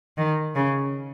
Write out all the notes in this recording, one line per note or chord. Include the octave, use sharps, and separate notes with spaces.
D#3
C#3